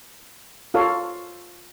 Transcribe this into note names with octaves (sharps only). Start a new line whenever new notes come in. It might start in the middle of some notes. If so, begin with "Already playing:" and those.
F4 A4 C#5 F5